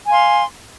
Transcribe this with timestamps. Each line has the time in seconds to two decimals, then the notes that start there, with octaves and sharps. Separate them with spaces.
0.06 G#5
0.10 F5
0.13 C6